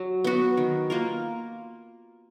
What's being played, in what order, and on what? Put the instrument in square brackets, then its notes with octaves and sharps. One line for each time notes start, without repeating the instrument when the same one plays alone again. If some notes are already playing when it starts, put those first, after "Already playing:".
Already playing: [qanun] F#3 F#4
B3 F#4
D#3
A#3 F4 A#4